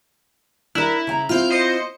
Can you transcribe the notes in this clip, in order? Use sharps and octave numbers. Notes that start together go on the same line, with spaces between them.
D4 E4 A#4
C#3 G#5 A#5
C4 E4 F4 F6 G6
C5 D#5 C#7